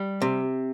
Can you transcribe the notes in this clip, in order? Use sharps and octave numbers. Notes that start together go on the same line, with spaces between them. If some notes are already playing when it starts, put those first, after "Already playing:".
Already playing: G3
C3